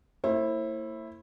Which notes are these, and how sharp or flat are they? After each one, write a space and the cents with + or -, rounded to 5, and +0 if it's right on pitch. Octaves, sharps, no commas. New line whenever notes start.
A#3 -45 E4 +0 C5 +40